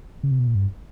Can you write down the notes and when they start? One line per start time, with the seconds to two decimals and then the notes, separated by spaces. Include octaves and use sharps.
0.23 C#3
0.31 C3
0.39 B2
0.47 A#2
0.55 G2